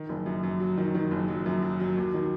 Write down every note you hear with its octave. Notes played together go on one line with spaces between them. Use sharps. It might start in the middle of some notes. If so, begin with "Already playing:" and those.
Already playing: D#3
F#1
F#2
F#2
F#3
D#3
D#3
F#1
F#3
F#2
F#3
F#3
D#2
D#3